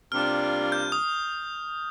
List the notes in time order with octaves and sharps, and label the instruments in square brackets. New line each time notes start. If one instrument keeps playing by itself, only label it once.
[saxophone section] C3 G3 A#3 D4 F4 [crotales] F6
[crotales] G6
D#6